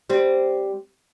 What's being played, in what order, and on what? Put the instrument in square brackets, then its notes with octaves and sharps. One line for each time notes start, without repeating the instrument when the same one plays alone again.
[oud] G3 C4